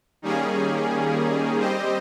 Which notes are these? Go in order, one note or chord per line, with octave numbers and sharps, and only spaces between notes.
D#3 G3 A#3 C#4 G#4
G3 C4 G4 C5 D#5